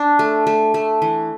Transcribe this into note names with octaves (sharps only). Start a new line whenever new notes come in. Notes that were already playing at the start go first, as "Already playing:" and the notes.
Already playing: D4
A3
A3
A3
E3